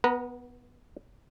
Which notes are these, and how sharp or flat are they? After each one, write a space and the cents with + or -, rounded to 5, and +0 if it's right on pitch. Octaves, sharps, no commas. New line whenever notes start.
B3 +0 B4 -35 A#5 +0